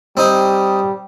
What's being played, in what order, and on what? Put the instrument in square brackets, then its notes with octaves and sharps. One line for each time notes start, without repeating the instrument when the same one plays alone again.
[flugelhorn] G3 [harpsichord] C4 D#4 C5